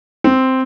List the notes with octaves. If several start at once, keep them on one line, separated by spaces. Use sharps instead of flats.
C4